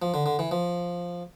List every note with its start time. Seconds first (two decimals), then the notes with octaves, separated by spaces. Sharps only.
0.02 F3
0.14 D3
0.26 D3
0.39 E3
0.51 F3